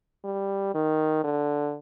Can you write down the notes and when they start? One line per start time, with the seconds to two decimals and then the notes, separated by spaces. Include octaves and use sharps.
0.25 G3
0.75 D#3
1.24 D3